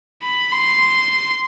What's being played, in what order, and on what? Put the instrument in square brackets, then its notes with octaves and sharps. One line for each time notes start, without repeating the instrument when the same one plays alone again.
[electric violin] B5
C6